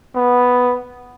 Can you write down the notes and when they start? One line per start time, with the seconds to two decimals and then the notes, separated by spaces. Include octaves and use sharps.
0.16 B3